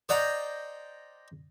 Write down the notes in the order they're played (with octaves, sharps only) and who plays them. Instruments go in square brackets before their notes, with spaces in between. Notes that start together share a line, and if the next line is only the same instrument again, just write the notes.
[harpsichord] C5 D5 D#5 F#5 G5 A#5